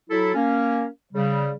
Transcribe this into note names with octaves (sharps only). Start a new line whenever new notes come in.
F#3 E4 A4
A#3 C#4
C#3 G3